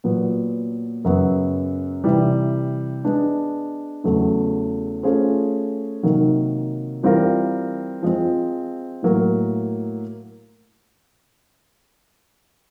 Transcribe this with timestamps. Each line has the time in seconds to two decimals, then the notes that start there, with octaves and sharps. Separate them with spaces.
0.04 A#2 F#3 B3
1.04 F#2 C#3 F#3 B3
2.04 C3 E3 G3
3.04 G#3 B3 D4
4.04 E2 C#3 F#3 A3
5.03 A3 C#4 F4 G#4 C5
6.03 C3 D#3 F#3 A#3
7.03 E3 G3 C4 F4 A#4
8.03 F3 G#3 C4
9.02 A2 F#3 A#3